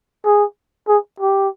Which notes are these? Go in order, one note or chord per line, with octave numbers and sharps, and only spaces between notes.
G#4
G#4
G4